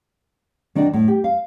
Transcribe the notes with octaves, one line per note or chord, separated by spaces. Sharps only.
D#3 D4 F#4 D5 G5
A2
G4
F5